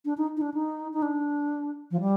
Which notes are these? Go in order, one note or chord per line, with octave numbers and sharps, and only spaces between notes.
D4
D#4
D#4
D4
D#4
D#4
D4
F3
G3